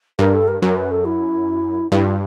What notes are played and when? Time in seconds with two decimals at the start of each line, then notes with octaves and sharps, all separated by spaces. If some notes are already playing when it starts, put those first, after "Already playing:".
0.19 G2 A#4
0.34 A4
0.48 A#4
0.62 F#2 A#4
0.76 B4
0.91 A4
1.05 E4
1.91 G2 E4
2.04 F4